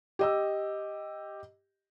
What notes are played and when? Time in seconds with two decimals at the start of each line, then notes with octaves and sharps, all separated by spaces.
0.19 G4 D#5 E6